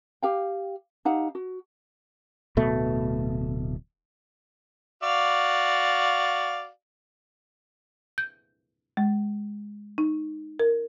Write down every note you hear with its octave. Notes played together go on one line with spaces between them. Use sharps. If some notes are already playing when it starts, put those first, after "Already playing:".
G4 F5 G5
D#4 G4 F5 F#5
F#4
D1 B2 A3
F#4 D5 F5
G6
G#3
D#4
A#4